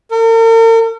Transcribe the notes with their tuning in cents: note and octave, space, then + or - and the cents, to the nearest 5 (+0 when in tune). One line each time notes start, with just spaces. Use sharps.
A#4 -45